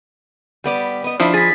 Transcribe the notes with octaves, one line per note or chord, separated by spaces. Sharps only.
G3 B3 D5
B3 D#5
F3 D4 E4
G#4 A6 B6